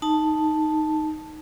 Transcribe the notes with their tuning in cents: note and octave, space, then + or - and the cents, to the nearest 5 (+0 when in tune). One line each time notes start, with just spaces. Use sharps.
D#4 +0 A5 +0